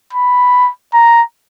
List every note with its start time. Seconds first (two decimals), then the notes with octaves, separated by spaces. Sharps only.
0.13 B5
0.94 A#5